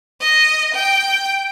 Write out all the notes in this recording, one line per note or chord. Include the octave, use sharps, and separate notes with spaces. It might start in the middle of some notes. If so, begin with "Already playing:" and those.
D#5
G5